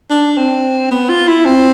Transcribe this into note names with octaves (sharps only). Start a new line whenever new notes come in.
D4
C4
B3
F4
E4
C4